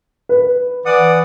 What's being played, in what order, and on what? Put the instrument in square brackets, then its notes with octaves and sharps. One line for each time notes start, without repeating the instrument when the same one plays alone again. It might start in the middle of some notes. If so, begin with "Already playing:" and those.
[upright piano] B4
[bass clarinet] E3 [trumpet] D5 [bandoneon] F#5 D#6